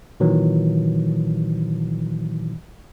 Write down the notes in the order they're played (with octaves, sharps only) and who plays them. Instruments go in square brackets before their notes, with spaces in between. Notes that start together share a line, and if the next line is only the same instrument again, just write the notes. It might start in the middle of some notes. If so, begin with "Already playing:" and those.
[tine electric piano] A#2 D#3 E3 F#3